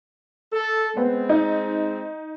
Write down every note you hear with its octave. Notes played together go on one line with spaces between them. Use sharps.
A4
G#3 B3 C4
D#4